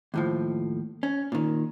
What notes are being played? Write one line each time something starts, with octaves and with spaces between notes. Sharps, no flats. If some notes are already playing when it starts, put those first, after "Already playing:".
D#2 A2 F3
C#4
A#2 D#3